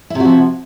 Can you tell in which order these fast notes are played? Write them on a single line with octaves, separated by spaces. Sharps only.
E4 C3 F#4 F3